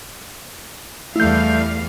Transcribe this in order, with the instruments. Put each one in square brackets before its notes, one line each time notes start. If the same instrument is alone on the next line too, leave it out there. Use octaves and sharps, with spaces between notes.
[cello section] E2 G3 F5 [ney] A3 [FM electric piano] E4 G6